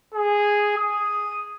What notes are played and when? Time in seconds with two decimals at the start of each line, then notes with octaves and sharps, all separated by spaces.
0.14 G#4
0.78 D#6